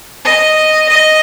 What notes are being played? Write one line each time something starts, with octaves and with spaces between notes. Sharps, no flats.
D#5
D#5